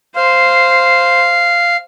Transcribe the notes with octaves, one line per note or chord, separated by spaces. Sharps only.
C5 F5